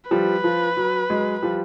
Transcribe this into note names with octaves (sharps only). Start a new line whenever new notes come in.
F3 G3 B4
F3
F#3
F#3 G#3
F3 G3